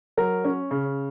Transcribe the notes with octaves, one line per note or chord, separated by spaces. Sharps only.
F#3 A#4
C#4
C#3